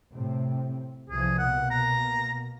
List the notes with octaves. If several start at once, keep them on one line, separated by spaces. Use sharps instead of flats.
A2 C3 C4
C2 E3 F3 G#4
B2 A#3 F#5
A#5